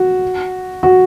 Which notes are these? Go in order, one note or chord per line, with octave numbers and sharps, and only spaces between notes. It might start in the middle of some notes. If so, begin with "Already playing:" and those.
Already playing: F#4
F#4